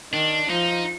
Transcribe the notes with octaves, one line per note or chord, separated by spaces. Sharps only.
D#3 D4
F3 D#4